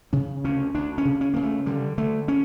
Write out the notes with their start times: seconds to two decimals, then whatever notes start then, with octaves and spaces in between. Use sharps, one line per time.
0.13 C#3 C#4
0.44 D2 C#4
0.75 D2 D4
0.98 C#4
1.05 C#3
1.21 C#4
1.34 C#3 A#3
1.43 A3
1.66 D3 G3
1.98 D3 A3
2.28 C#4